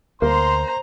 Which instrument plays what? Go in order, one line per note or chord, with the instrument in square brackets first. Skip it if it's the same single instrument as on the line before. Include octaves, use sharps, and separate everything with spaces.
[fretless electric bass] D2 [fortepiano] A#3 [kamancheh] C5 A#5 [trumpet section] C6